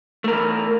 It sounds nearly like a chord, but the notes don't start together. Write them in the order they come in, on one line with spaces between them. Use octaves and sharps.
A3 A#4 E3